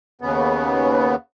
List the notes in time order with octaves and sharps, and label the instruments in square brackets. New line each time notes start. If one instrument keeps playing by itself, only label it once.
[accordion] D#2 C#3 B3